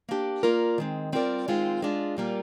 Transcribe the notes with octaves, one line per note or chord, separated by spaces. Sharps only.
A#3 D4 G4
A#3 F4 A#4 D5
D#3 G#3 C4
G3 C4 F4 A#4 D5
D#3 G#3 C4 F4 C5
G#3 D4 F4
A#2 G3 A#3 F4